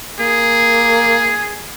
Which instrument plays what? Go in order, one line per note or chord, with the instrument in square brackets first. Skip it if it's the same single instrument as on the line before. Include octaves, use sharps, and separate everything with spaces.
[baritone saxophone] A#3 [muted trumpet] G#4